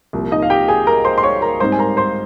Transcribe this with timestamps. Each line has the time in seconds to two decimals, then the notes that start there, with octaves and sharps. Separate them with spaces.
0.13 C2 A#2 F3
0.31 D#4 D#5
0.42 F5
0.50 G4 G5
0.68 G#4 G#5
0.87 A#4 A#5
1.05 C5 C6
1.18 C6
1.23 C#5 C#6
1.42 A#4 A#5
1.60 G#2 G3 C4 D#4 C5 C6
1.72 G#5
1.79 A#4 A#5
1.97 C5 C6